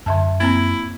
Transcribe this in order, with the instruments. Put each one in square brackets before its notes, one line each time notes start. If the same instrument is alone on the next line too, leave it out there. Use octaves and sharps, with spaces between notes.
[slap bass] F#2 [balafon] D3 E5 A5
[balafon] A#3 C4 A#5 [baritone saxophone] E4